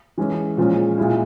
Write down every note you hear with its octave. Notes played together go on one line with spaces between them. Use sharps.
E3 G#3 C#4
A#2 F3 G#3 C#4
A#2 G#3 E4